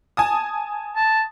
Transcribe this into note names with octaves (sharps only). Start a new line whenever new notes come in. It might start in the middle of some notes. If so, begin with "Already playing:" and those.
G#5 A5 D#6
A5